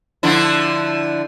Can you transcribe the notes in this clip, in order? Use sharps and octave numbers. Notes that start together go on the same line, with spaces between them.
D3 F3 E4